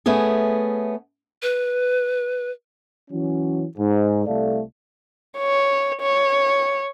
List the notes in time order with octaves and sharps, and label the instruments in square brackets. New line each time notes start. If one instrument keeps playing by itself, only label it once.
[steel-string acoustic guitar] A3 B3 C#4 G#4
[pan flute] B4
[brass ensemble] E3 F#3 C#4
G#2
C2 A3 A4 D5 F5
[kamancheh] C#5
C#5